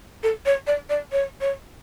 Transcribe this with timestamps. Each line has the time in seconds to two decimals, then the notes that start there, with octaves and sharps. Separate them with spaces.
0.23 A4
0.46 C#5
0.67 D5
0.90 D5
1.12 C#5
1.41 C#5